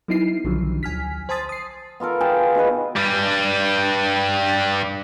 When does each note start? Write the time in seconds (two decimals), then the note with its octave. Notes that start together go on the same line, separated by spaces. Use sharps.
0.08 F#3 B3 D#4 E4 C7
0.44 B1 D3 D#3 F3 F#3
0.83 D2 G#5 F6 B6
1.29 C5 G#5 A5 C6 D#6 A6
1.49 D#6 C7
2.00 B3 F4 A4 A#4
2.21 G#4 G5 A5
2.55 B2 D#3 G#4 B4
2.96 G2 G3